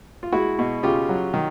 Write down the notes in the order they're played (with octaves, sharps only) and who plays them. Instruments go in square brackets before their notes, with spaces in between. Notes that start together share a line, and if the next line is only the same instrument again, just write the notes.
[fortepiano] F4
G#3 E4 F#4
B2
C#3 F4 G4
F#3
D#3